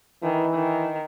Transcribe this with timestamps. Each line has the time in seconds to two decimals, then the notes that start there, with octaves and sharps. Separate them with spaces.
0.23 D#3 E3
0.54 D#3